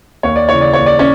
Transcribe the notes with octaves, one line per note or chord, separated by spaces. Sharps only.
D#2 C#5
D5
C#3 E3 C#5
D5
D#2 C#5
D5
C#4 C#5